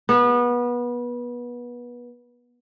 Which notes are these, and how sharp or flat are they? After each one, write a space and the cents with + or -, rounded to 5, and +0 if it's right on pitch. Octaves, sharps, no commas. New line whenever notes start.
B3 -25